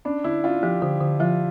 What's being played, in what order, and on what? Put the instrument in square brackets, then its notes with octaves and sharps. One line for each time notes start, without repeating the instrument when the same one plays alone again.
[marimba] C#4 [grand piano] D4
[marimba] D3 [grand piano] E4
[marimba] C#4 [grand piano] F4
[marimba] F3 [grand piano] G4
[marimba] D3 [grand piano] G4
[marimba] D3
[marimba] F3 [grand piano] F4